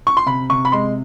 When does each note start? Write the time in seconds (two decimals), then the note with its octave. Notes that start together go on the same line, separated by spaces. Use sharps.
0.07 C#6
0.17 C6
0.26 C3 B5
0.50 C3 C#6
0.65 B5
0.72 G#3 C6